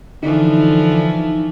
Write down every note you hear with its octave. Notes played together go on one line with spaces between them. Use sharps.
D3 E3 F3 D#4